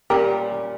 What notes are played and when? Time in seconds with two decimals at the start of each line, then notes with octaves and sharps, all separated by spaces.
0.10 A#2 G3 C#4 G4 A#4